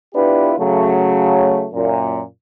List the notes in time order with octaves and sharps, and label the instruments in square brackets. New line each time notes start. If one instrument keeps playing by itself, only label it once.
[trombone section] B3 D4 E4 F4 G4 B4
C#3 F#3 A3
F#2 A#2